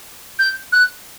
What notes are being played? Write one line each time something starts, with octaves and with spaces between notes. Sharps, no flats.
G6
F#6